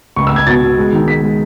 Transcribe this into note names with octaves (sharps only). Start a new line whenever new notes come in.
C#2 C#6
E6
C#2 G#6
B2 A6
B2
G#3
D#3
G#3 B6
G#3